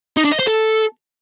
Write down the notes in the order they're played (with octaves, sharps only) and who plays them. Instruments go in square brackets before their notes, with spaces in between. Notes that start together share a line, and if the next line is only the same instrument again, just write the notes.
[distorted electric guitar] D#4
D4
D#5
C5
A4